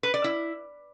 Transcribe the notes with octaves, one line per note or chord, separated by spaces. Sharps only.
B4
D5
E4